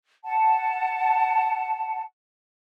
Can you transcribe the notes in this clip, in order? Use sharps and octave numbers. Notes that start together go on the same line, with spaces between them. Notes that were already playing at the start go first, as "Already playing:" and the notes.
F#5 A5